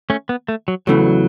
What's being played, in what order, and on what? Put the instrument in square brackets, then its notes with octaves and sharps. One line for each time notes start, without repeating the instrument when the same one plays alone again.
[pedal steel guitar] A3 C#4
B3
A3
F#3
[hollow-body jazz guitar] E2 C#3 E3 A3 [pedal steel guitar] F#3